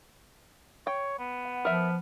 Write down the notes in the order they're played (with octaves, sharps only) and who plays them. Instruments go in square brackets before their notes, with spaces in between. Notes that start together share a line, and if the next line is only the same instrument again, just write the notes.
[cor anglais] C#5 [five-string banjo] G5
[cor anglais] B3
[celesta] F#5
[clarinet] F3 [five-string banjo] A#4 E5 [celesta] F6